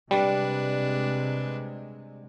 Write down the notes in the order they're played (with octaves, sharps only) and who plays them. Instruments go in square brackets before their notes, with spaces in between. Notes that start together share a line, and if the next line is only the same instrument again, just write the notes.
[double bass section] C3 G#3 [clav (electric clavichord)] G3 [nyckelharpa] D4 B4